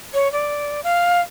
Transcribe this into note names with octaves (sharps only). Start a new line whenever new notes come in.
C#5
D5
F5